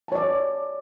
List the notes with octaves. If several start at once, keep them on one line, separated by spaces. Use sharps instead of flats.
C#5 D5 A5